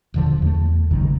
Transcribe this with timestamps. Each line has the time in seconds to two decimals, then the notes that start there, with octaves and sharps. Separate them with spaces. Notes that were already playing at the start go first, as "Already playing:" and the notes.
0.14 D#1 D3 F3
0.42 E2 A3
0.91 G#1 C#2 F#2 D#3